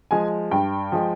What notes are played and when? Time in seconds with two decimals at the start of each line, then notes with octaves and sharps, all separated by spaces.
0.11 F3 G#3 G#5
0.51 G2 G5
0.92 F3 G#3